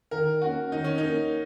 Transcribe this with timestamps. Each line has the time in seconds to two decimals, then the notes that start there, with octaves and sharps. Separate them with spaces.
0.11 D#3 A#4
0.41 A#3 C#4 F#4
0.72 D#3 D#4
0.84 C#4
0.98 A#3 C#4 D#4